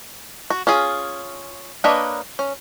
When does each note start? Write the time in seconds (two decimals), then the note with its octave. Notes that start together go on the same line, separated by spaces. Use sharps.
0.50 F#4
0.67 C#4 F4 G#4
1.84 A#3 D4 B4 C#5 D#5
2.39 C#4